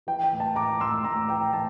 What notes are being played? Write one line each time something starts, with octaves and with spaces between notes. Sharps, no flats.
E3 G5
G5
A2
A5
A2 A#5 D6
A2 C6 E6
A2 A#5 D6
E3 G5 A#5
A2 A5